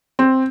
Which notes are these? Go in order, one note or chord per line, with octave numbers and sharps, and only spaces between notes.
C4